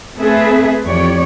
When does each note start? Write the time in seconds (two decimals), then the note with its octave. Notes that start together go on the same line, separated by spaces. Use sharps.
0.17 A3 C4 G#4 A4 B4 E5
0.86 F2 E3 G4 C#5 D5